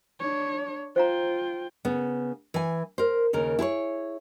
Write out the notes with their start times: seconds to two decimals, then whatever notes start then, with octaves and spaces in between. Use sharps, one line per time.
0.20 D4 C#5
0.96 F4 C5 F5 G5 A#5
1.85 C#3 B3
2.54 E3 G#5
2.98 A#4 C5
3.33 D#2 C#3 A#4
3.59 E4 G#4 B4 C#5